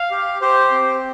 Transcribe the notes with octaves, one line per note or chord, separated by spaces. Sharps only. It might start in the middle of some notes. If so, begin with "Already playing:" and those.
Already playing: F5
G4
G4 C5
C4